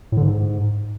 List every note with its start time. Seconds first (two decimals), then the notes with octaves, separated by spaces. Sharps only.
0.12 A2
0.17 D3
0.22 G#2